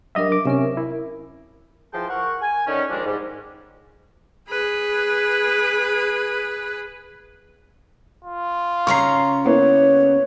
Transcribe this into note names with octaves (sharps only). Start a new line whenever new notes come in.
F#3 G3 D4 A#4 D#5 E5
D6
C3 C#4 A#4 E5
E4
E3 F3 G#4 G5 A5 C6
A#4 F#5 C#6
G#5
D3 D#3 C#4
D#2 D#3 F3 G#3 D4
G#2 G3
G#4 B4
F4
C#3 C#4 A#5 C#6 C7
A#3 B3 E4 C#5